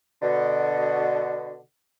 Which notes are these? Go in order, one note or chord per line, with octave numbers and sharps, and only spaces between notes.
B2 D3